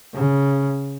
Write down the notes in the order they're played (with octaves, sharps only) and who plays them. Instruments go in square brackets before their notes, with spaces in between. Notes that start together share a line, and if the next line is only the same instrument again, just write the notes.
[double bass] C#3